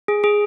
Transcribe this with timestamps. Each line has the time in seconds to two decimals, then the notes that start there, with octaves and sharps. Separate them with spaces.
0.08 G#4
0.24 G#4